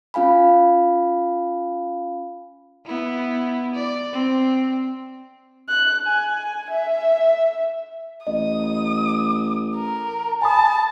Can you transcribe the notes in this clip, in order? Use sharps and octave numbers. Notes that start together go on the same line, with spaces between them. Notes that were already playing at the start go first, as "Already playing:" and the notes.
C#4 F4 F5 G#5 B5
B3 E4
D5
C4
F#6
G#5
E5
A1 D#5 D#6
A#4
G#5 A5 B5 D#6